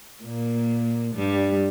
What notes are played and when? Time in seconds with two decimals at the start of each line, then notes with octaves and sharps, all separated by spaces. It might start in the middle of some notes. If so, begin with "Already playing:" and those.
0.24 A#2 A#3
1.15 G2 G3